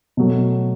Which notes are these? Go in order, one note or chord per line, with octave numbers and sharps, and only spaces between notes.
B2 F#3 A3